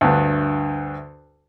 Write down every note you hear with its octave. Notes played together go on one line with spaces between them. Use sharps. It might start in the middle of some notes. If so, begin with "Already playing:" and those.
D2 G2